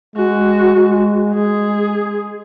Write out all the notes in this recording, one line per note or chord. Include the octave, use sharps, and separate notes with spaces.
G#3 F#4
G#3
G#3 G#4